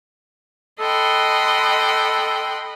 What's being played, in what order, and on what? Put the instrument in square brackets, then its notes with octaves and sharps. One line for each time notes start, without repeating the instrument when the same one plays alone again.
[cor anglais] A4 [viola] D#5 B5 [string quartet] F#5 G5 C6